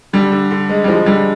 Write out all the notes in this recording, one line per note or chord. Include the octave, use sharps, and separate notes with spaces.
D3 G3
D3
D3
G#3
G3
F3 G#3
D3 G3